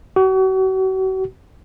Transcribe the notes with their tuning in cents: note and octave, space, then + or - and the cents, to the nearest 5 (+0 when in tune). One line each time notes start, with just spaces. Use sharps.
F#4 +40